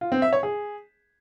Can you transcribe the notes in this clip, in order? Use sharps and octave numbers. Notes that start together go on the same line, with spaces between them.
F4
C4
E5
C#5
G#4